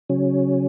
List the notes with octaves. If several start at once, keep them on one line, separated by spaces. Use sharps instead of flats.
C#3 F#3 C#4